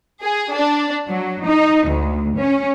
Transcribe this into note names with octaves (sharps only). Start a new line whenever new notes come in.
G#4
D4
F#3
D#4
D2
C#4